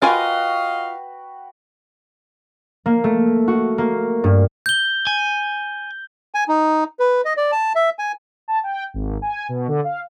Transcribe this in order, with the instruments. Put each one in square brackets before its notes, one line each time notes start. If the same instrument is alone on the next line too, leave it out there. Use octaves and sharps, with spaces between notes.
[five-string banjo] F4 A#4 G#5 [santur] F#4 B4 G5 [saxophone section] D#5 F5
[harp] A#3
A3
F#4
A#3
G2
[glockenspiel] G6 G7
[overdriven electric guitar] G#5
[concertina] G#5
D#4
B4
D#5
D5
A5
E5
G#5
[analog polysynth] A5
G5
G#1
G#5
B2
D3
F5